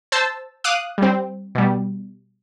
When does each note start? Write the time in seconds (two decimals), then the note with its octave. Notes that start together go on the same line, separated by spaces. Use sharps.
0.12 C5 A5 E6
0.64 F5 D6 D#6 F#6
0.98 G3 C4
1.55 B2 G3